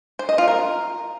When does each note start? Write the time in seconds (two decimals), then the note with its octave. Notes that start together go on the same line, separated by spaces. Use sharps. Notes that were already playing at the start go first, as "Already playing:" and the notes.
0.19 C5
0.29 D#5
0.38 F4
0.48 A#4